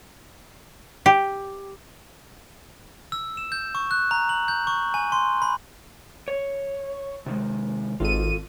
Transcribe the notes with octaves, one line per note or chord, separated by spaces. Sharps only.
G4
E6
E7
G6
C#6
F#6
A#5
F#7
G6
C#6
G#5
C6
B5
C#5
C3 D#3 G#3
G#1 F4 A4 D#7